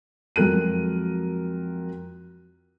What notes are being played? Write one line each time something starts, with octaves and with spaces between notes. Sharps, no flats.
F2 F#3 G#3 A#4 F#6 D#7